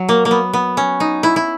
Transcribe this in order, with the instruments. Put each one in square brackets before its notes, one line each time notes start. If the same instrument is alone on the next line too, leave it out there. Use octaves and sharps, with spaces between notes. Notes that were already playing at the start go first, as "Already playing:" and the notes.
Already playing: [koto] F#3
A#3
A#3
B3
B3
C#4
D#4
E4
E4